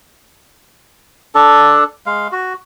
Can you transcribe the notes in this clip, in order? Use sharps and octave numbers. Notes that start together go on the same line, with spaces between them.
D4 A4
G#3 F5
F#4